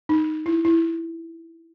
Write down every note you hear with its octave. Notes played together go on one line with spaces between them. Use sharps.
D#4
E4
E4